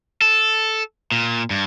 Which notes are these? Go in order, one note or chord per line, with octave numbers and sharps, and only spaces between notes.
A4
A#2
G2